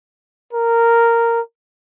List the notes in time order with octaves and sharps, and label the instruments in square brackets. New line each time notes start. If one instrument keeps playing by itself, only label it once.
[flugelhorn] A#4